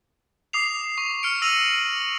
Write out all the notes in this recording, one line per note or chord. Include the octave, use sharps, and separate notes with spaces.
D6 D#6 C7 F7
C#6
F6 C#7 D7
E6 A#6 D#7 F7 F#7